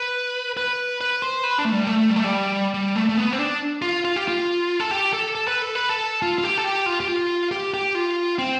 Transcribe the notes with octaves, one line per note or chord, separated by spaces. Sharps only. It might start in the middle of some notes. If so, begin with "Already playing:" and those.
Already playing: B4
B4
B4
C5
B4
D4
A3
G3
A3
G3
A3
G3
G3
A3
A3
B3
C4
D4
F4
F4
G4
F4
A4
G4
A4
A4
B4
A4
B4
A4
F4
F4
G4
A4
G4
F4
G4
F4
G4
G4
F4
C4